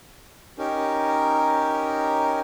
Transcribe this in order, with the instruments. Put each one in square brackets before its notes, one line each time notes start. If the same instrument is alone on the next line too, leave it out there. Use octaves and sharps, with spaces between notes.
[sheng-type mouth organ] C#4 D#4 G4 A#4